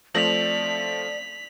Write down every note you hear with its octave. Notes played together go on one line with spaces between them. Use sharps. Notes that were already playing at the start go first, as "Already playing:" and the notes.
F3 A3 C4 D5 B6 F7 F#7